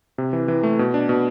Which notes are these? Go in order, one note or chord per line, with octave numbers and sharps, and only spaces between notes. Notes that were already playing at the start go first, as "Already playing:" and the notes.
C3
E3
E3
A3
B2
D4
B2